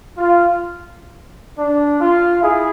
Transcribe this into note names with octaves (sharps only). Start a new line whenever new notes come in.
F4
D4
F4
E4 G#4